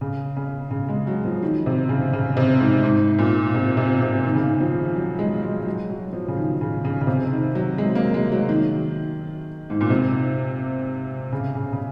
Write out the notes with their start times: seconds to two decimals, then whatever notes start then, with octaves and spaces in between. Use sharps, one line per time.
0.01 C#3
0.37 C#3
0.71 C#3
0.89 G#3
1.07 F#3
1.25 F3
1.43 D#3
1.66 C3
1.89 C#3
2.13 C#3
2.37 C3
2.60 G#2
2.83 G#2
3.19 A#2
3.55 C3
3.77 C3
4.02 C3
4.25 D#3
4.35 C#3
4.46 D#3
4.60 F3
4.96 F#3
5.19 G#3
5.43 G#3
5.67 F#3
5.90 F#3
6.13 F3
6.28 C#3
6.36 D#3
6.61 C#3
6.85 C#3
7.01 C#3
7.07 C3
7.32 D#3
7.55 F#3
7.78 G#3
7.95 A#3
8.14 G#3
8.32 F#3
8.49 D#3
9.70 G#2
9.81 A#2
9.90 C3
11.32 C#3
11.55 C#3
11.73 C#3